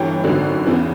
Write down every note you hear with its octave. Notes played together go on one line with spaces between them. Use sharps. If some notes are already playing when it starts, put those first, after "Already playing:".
Already playing: G1 G2 E3 G5
G#1 F#2 D3
E2 C#3 E3